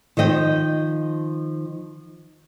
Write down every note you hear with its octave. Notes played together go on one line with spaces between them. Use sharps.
D#3 F3 D#5 G5